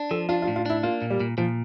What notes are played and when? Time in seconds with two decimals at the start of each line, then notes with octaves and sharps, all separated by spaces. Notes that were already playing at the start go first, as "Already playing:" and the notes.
Already playing: D4
0.11 F3 A4
0.29 D4 F4
0.42 F4
0.47 A2
0.56 F4
0.66 D4 E4
0.83 A#3 F4
1.02 A#2
1.10 G3
1.20 A#2
1.38 A#2 F3